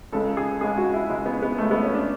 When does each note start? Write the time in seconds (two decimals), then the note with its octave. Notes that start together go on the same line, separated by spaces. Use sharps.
0.13 C#2 C#3 G#3 A4
0.37 G#4
0.61 C#2 C#3 G#3 G#4
0.77 F#4
0.94 E4
1.10 C#2 C#3 G#3
1.26 B3
1.42 B3
1.58 C#2 C#3 G#3 A3
1.71 B3
1.83 C#4
1.95 D4